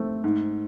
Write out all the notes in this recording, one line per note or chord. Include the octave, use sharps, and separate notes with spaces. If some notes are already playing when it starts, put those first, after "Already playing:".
Already playing: A3 C4
G#2